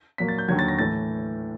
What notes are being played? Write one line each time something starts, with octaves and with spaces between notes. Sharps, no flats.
A#2 F#3 A#3 B6
A6
G6
D#2 D3 F#3 G#6
A6
A#6
A2 E3 A3 A6